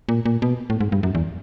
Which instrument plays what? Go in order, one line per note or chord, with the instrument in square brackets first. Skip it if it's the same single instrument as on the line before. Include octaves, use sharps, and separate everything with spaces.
[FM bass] A#2
A#2
B2
A2
G#2
G2
F#2
E2